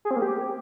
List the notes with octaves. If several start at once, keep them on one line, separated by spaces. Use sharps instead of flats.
G#4
C4
A#3
G4